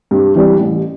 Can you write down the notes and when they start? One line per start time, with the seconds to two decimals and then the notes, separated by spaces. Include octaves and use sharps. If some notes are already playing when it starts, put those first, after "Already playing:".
0.11 G2
0.35 E3 G3 D4
0.58 A1